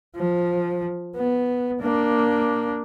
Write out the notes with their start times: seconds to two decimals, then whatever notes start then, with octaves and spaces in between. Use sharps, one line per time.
0.16 F3
1.16 B3
1.82 A#3 D4